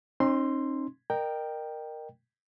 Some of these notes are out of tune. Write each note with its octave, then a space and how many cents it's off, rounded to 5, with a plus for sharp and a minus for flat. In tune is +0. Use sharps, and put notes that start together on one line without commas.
C4 +45 D#4 -20 C6 +0
A#4 +0 D#5 -35 G5 +0